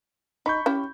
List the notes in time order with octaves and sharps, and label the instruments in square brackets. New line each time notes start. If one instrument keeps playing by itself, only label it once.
[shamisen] D#4 [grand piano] B5 C#6 G6
[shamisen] C#4 E4 G4